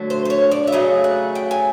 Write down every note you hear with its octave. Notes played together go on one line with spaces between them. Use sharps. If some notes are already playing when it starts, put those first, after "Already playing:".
Already playing: D3 F#3 A3
C5
C5
C#5
D5
E5
C#3 F#3 A3 D#5
F#5
G5
G#5